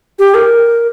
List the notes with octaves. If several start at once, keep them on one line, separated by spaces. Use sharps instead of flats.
G4
A#4